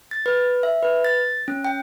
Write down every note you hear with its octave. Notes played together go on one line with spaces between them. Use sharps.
A6
B4
E5
B4
A6
C#4
G5